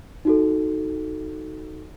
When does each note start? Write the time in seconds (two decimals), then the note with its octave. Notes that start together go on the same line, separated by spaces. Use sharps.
0.25 D#4 F#4 A4